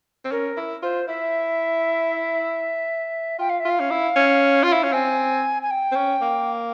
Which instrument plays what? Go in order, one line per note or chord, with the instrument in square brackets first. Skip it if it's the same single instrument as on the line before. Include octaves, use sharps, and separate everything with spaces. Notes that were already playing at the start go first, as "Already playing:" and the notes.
[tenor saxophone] C4
[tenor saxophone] C#4 [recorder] A#4
[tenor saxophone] E4
[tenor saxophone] F4 [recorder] C5
[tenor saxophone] E4 [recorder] E5
[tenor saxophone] F4 [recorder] G5
[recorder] F5
E5
[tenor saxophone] F4 [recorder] F5
[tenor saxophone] C#4
E4
C#4
F4
E4
C#4
[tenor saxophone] C4 [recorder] G#5
[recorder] G#5
G5
[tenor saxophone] C4
C#4
A#3